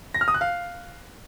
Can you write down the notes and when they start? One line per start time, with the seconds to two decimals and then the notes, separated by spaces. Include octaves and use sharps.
0.14 A#6
0.21 F6
0.28 D#6
0.34 F#6
0.41 F5